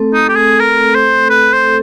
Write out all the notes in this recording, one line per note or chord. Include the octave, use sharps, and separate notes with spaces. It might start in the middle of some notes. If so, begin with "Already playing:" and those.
Already playing: A3 C4 A4
D#4
G4 A4
G#4
A4 A#4
C4 C5
A4 B4
C5
A4